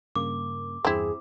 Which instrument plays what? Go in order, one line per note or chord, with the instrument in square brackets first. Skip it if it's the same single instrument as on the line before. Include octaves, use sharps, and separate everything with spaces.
[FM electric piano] G2 C#3 A#3 [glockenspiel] D6
[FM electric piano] E2 G2 [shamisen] C4 E4 [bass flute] G#4